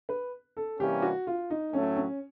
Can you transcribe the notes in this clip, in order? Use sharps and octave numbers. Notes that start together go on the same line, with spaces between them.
B4
A4
C3 E3 G3 A#3 C#4 G4
F#4
F4
D#4
A2 F#3 A3 C#4
C#4